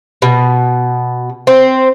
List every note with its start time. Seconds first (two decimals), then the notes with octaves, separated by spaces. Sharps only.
0.22 B2
1.47 C4